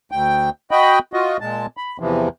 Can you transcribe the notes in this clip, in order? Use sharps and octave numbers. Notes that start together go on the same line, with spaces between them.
D2 G5
F#4 D#5 G5 B5
F4 F#4 D#5
A#2 G#3 A5
B5
E2 C3 E3 F3